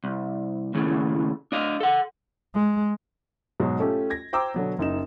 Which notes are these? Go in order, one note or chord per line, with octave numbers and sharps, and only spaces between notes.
C2
D#2 A2 C#3
D4 D#5 F5
A4 F#5
G#3
G#2 B2 F#3
A3 C#4 F4 G4 A4
G#6 A#6
C5 G5 A#5 D6 E6
B2 D3 F#3 B3
F#1 D#4 E7